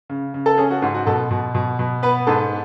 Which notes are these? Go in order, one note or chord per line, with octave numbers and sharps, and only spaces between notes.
C#3
C#3
A4
C#4 G#4
F#4
G#2 F#4
F#4
B2 A4
B2
B2
B2
B3 B4
G#2 A4